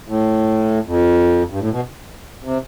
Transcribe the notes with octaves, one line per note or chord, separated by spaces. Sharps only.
A2
F2
G2
A2
B2
C3